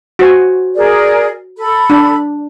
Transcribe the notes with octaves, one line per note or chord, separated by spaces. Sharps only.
F#4 C5 G#5
G#4 A#4 D5
A4 B5
D4